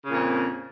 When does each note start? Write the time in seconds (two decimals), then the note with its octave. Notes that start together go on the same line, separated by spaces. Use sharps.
0.05 C#3
0.09 A#2
0.13 F2